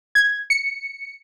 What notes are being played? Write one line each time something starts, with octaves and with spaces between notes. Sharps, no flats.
G#6
C#7